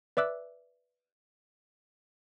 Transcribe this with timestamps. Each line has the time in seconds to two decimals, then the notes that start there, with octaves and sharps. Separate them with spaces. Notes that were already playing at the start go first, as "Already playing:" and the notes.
0.17 B4 D5 E5 D6 E6 F#6